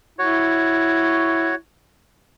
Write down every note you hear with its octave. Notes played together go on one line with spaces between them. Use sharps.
E4 F#4 C#5